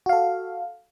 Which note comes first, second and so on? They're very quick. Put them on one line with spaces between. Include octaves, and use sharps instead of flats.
F#4 F5 A4